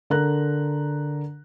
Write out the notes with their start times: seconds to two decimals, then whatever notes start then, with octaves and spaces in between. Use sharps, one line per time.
0.10 D3 A#4 A#5 F#6